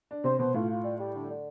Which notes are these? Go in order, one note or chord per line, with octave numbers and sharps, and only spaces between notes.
D4
C3 C4 C5
B2 B3 C5
A2 A3 F4
F4
G3
G3
D3
D3